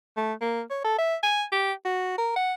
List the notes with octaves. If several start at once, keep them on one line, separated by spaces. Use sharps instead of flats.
A3
A#3
C#5
A4
E5
G#5
G4
F#4
A#4
F#5